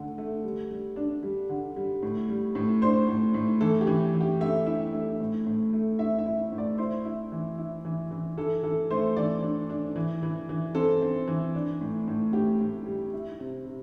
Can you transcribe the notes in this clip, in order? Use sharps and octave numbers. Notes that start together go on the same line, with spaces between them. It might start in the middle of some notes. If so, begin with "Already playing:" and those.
Already playing: D3 A3 D4
A3
G3
G3
D4
G3
D3
G3
A2
G3
A2
D4 C5
A2
A2
E3 A4
G4
E3
E3
G4
A3 E5
E4
A3
A2
A2
A3
E4 E5
E5
E4
A2
D5
E4 C5
E4
E3
E4
E3
E3
E3 A4
E3 A4
A3 C5
E3 D5
D4
D4
E3
E3
E3
C4 A4
C4
E3
D4
A2
A2
A2 G4
A2
G3
E4
C3
C3